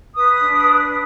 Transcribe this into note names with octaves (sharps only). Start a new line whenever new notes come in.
B4 D#6
D4
B4